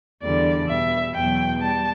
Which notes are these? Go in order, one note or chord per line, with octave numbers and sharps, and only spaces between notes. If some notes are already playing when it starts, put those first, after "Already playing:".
E2 D3 G3 D5
B2 G3 E5
E2 B2 F#3 G5
G3 A5